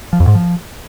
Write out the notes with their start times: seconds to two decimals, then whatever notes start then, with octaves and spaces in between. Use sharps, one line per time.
0.13 F3
0.20 F2
0.27 G#2
0.35 F3